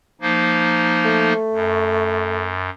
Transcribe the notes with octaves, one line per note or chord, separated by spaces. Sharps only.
F3 A#3 D#4
A3
F#2